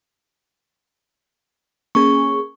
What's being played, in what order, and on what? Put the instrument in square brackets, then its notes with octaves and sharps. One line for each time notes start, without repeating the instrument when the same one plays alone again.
[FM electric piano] A#3 C#4 G#4 [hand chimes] C#6